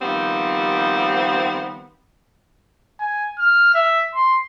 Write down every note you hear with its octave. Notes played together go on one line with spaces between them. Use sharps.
D#3 F3 G3 B3 C4
G#5
F6
E5
C6